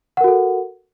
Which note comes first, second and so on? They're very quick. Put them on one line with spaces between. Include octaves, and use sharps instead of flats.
F#5 A#4 F#4 A4